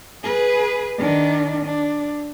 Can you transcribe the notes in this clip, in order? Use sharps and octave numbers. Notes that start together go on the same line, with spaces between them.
G#4 B4
D#3 D4
D4